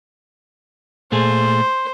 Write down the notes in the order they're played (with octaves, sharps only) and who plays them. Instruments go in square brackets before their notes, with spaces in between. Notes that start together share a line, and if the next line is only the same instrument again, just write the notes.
[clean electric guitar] A#2 A3 G#4 [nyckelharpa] C5